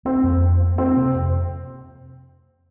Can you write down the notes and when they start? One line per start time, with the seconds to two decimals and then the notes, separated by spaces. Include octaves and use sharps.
0.05 A#3 C4
0.23 F2
0.42 A#3
0.61 A#3
0.78 A#3 C4
0.97 C3
1.15 F2